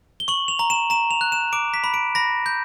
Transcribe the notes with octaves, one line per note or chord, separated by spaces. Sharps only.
G7
C#6 F#7
F7
A#5
E7
A#5 E7
F7
F#6
E7
D6 D7
B6
B5
D7
B5 A#6
G6